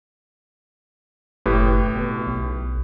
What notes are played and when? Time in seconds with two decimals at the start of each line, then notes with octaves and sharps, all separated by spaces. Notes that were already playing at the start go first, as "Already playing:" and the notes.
1.46 F#1 A2 G4 B4
1.96 B2
2.27 B1